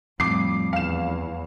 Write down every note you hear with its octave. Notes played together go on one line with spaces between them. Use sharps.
F2 A2 G3 D6 C7
E2 F5 E7